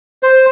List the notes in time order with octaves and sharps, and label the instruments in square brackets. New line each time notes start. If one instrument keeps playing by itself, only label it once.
[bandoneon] C5